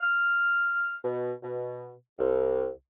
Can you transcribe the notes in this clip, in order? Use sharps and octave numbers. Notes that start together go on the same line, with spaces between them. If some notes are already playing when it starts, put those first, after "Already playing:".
F6
B2
B2
C2